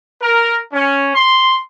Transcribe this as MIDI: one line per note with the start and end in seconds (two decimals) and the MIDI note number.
0.22 0.58 70
0.73 1.11 61
1.15 1.55 84